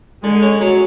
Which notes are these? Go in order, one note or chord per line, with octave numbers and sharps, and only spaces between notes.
D3 G#3
C#4
F#3